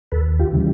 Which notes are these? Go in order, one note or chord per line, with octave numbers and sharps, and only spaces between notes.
D#2 A4 B4
F4 G4
C#3 E3 G3